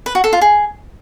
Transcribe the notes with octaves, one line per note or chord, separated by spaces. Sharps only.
B4
F#4
A4
F4
G#4